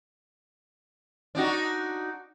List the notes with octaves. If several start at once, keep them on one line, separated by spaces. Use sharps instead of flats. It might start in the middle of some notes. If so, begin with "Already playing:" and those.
D4 D#4 F#4